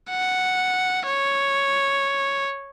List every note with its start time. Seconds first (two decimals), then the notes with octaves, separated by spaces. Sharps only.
0.10 F#5
1.07 C#5